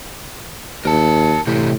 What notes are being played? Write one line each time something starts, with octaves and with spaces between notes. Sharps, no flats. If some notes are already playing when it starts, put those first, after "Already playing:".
D#2 A#4 A5
A2 C3 E3 G4